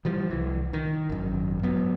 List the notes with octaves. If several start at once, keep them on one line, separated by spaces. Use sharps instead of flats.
E3 F3 G3
C2 E3
D#3
G#1 F#2
G#2 F#3 B3